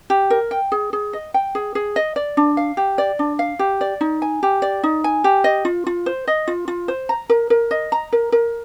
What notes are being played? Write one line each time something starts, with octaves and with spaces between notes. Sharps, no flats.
G4
A#4
G5
G#4
G#4
D#5
G5
G#4
G#4
D#5
D5
D4
F5
G4
D5
D4
F5
G4
D5
D#4
G#5
G4
D5
D#4
G#5
G4
D#5
F4
F4
C5
D#5
F4
F4
C5
A#5
A#4
A#4
D#5
A#5
A#4
A#4